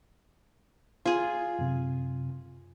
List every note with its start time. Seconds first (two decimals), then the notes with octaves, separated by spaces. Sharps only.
1.06 F4 G#4
1.59 F#2 C3